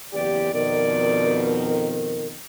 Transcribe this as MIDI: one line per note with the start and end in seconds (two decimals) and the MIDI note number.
0.13 0.51 30
0.13 0.51 40
0.13 0.51 67
0.13 0.52 74
0.53 2.38 41
0.53 2.38 47
0.53 2.38 51
0.53 2.26 70
0.53 1.72 74